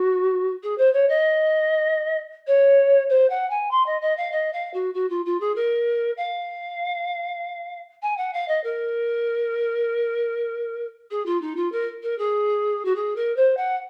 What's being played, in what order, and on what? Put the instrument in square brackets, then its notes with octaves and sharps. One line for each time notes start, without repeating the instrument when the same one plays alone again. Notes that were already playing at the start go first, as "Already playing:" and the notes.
Already playing: [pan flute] F#4
G#4
C5
C#5
D#5
C#5
C5
F#5
G#5
C6
D#5
D#5
F5
D#5
F5
F#4
F#4
F4
F4
G#4
A#4
F5
G#5
F#5
F5
D#5
A#4
G#4
F4
D#4
F4
A#4
A#4
G#4
F#4
G#4
A#4
C5
F#5